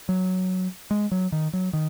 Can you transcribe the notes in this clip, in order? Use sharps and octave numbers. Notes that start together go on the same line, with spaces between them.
F#3
G#3
F#3
D#3
F#3
D#3